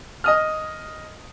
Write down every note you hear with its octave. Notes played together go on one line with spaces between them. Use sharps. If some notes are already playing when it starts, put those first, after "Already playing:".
D#5 D#6 F6